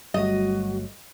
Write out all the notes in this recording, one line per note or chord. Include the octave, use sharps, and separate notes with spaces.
G1 F#3 G3 A3 F#4 D#5